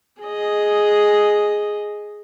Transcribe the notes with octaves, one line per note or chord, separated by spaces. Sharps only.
G#4 D#5